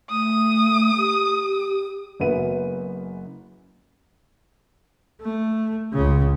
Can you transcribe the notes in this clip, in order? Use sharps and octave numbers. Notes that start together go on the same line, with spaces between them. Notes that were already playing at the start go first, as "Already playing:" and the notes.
A3 D#6
G4
F#1 F#2 C#3 B3 E5 D#7
A3
C#2 C#3